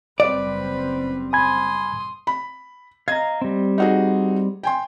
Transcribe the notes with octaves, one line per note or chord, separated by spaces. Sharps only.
F#1 G3 C4 B4 D5 B5
G#5 B5 C6 D#6 G#6
B5
D#5 F5 A#5 G#6
G3 C4
D#4 F#4 G#4
G5 G#5 C6